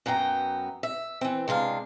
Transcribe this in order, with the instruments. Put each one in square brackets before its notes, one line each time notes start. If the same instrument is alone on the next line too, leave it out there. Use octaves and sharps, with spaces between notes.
[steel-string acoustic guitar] F#2 F#3 B3 G5 A#5
E5
E3 C4
C3 G#3 D4 F5